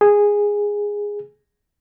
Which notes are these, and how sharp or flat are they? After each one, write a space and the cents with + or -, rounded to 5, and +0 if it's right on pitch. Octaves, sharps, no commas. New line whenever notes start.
G#4 -10